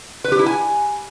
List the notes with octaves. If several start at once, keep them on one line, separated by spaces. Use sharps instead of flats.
B4
G4
E4
G#5